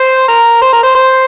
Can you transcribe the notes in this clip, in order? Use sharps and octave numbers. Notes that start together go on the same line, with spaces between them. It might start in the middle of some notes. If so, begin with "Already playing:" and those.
Already playing: C5
A#4
C5
A#4
C5
C5